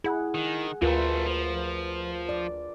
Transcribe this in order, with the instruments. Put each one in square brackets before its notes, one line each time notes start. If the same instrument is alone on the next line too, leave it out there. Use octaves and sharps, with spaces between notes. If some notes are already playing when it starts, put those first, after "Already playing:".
[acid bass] E4 [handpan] G#4 F#5
[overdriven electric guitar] D#3
[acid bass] D2 [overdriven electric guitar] E3 A3 [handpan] F4 A#4 B4
[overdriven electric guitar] F3
[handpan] D5